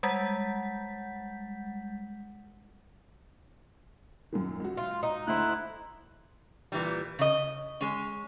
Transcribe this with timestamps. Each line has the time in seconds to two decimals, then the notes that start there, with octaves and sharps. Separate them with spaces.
0.03 G3 G#3 F#5 G6 A6 B6
4.32 F#2 A#2 D#3
4.60 C#2 F#4
4.77 F4
5.03 D#4
5.27 D2 D3 E4 C5 F#6
6.72 A#2 E3 G3
7.19 C#3 D#5
7.81 G#3 C#4